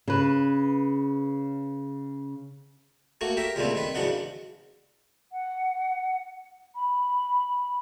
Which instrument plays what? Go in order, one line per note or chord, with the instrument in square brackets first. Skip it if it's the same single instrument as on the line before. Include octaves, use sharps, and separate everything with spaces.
[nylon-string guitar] C#3 B4
[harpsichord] A3 A#3 F#4
G4 A#4 E5
C#2 A#2 G3 A3 C4
D#3 B4
E2 G#2 C#3 F#3 D4 F#5
[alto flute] F#5
[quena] B5